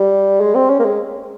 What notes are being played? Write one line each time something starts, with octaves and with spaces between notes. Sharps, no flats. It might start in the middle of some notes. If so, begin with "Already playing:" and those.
Already playing: G3
G#3
C4
C#4
A#3
G#3